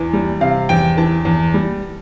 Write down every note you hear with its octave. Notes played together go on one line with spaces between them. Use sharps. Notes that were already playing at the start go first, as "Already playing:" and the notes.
Already playing: E2 E3
G3
C3 F5
E2 G5
E3 A5
E2
G3